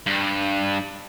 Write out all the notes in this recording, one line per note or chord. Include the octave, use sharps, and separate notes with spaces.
G2